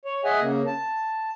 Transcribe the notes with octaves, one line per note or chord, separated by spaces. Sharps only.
C#5
G#4 D#5 E5 F#5 G#5
C#3 A#3
A5